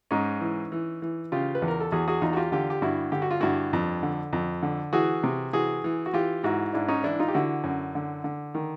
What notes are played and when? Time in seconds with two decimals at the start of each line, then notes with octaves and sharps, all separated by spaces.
0.11 G#2 C#4 D#4
0.41 E3
0.72 E3
1.02 E3
1.32 C#3 F4 G4
1.55 B4
1.62 E2
1.68 A#4
1.80 A4
1.92 E2 F#4 G#4
2.08 F#4 G#4
2.21 E2 D#4 F4
2.33 F#4
2.37 F4 G4
2.52 D3 F4 G4
2.70 G4
2.82 G2 E4 F#4
3.12 D3 G4
3.22 F#4
3.31 F4
3.40 G2 E4 F#4
3.73 F2
4.03 D3
4.33 F2
4.63 D3
4.93 E3 F#4 G#4
5.24 C3
5.53 E3 F#4 G#4
5.84 E3
6.06 F#4
6.13 E3 F4 G4
6.43 G#2 E4 F#4
6.73 G#2 D4 E4
6.88 C#4 D#4
7.04 E3 D4 E4
7.19 D#4 F4
7.28 G4
7.34 D3 E4 F#4
7.64 F#2
7.95 D3
8.24 D3
8.55 D#3